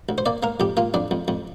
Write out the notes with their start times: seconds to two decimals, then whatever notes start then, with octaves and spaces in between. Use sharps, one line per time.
0.09 D2
0.18 C5
0.26 A#3 D5
0.43 A#3 A#4
0.60 F2 G4
0.77 A#3 F4
0.94 F2 D4
1.11 F2
1.28 F2